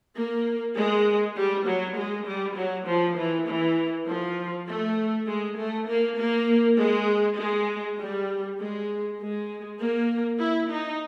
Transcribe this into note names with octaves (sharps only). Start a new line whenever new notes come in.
A#3
G#3
G3
F#3
G#3
G3
F#3
F3
E3
E3
F3
A3
G#3
A3
A#3
A#3
G#3
G#3
G3
G#3
G#3
A#3
E4
D#4